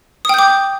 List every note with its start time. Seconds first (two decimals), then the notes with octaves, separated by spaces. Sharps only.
0.25 D#6
0.29 G5
0.34 G6
0.39 D6